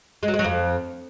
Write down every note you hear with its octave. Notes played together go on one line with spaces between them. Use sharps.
G#3
F#3
G#3
F#3
F2